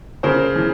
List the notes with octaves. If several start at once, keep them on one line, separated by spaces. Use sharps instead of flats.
C#3 A#4 C5
E3